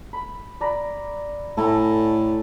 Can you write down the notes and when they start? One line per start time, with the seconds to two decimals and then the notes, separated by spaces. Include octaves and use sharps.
0.13 B5
0.61 D5 A#5 B5
1.57 A2 A4 G#5 A#5